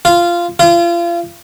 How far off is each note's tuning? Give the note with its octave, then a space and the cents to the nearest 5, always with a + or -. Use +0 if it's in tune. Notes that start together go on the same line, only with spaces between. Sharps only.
F4 -15
F4 -35